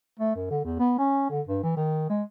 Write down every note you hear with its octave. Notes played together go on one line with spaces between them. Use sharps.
A3
F#2
D3
E2
B3
C#4
D3
G2
E3
D#3
G#3